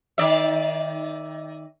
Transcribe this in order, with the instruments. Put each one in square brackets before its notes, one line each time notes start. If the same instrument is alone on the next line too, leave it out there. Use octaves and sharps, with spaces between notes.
[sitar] D#3 D5 E5